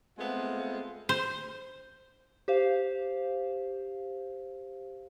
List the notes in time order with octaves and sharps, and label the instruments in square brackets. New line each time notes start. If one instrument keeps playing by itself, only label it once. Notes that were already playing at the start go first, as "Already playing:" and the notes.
[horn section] G#3 A3 B3 C4 F4
[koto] C5
[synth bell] G4 C5 F5